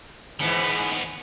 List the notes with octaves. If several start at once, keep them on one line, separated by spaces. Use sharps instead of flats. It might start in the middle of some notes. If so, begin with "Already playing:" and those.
G#2 D#3 E3 B3